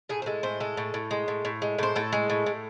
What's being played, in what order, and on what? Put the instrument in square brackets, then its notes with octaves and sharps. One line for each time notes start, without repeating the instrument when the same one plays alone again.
[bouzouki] A2 G#4
C5
G#3 A4
A2 C5
G#3 A4
A2
A2
G#3
A2
A2
G#3
A2 C5
A2 A4
G#3
A2
A2